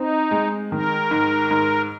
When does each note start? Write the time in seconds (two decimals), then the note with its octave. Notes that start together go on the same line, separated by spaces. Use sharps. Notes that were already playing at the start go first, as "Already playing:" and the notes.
Already playing: C4 D#4
0.31 G#3
0.71 D#3 A#4
1.11 G#2
1.51 G#2